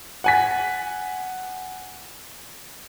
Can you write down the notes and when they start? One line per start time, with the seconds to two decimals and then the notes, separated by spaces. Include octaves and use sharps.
0.24 F#5 G#5 B6